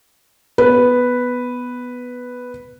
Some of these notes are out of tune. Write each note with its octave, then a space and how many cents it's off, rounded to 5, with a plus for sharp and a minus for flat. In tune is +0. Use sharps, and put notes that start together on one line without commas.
B3 +0 B4 +0